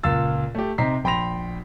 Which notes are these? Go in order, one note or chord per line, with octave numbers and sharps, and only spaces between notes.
C#2 A#2 F5 E6 A6
A3 G4
C3 C4 D#4 A#5 B6 C7
A#1 G5 B5 C6 A#6 F7